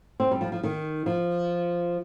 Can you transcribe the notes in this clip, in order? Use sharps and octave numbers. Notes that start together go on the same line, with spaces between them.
C4
G3
F3
F3
D#3
F3